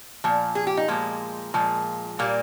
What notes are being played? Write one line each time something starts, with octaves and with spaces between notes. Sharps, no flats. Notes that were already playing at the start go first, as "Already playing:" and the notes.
A#2 F3
G#4
G4
D#4
A#2 F3 G#3 A#3
A#2 F3 G#3
A#2 G3 A#3